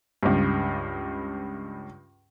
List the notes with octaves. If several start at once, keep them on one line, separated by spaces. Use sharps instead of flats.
C#2 G2